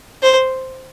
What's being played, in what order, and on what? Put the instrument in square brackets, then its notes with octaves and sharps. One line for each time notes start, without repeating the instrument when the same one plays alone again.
[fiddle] C5